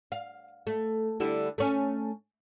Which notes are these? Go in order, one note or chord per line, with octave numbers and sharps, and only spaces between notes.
F5
A3
D3 G3 E4
A3 C#4